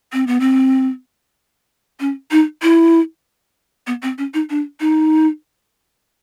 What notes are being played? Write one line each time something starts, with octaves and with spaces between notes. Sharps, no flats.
C4
B3
C4
C#4
D#4
E4
B3
C4
C#4
D#4
D4
D#4